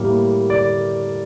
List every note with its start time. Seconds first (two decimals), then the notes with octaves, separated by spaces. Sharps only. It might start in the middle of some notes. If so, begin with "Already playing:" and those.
Already playing: A2 G3 A#3
0.50 D5